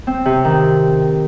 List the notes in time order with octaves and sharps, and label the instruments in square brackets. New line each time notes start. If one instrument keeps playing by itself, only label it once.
[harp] C4
C3
D#3